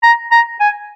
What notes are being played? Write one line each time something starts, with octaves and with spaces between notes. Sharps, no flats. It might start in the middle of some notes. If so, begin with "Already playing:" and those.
A#5
A#5
G#5